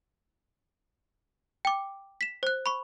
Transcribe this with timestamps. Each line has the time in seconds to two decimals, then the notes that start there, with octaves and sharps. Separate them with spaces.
1.65 G5 D6
2.21 B6 E7
2.43 C5 F#6
2.66 B5 C#6